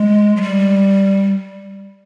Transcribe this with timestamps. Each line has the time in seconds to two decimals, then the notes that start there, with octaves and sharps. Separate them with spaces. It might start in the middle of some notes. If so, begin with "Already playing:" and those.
Already playing: G#3
0.36 F#3
0.41 G3